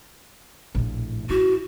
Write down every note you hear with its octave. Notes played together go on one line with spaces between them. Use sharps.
A#1 A2
E4 F#4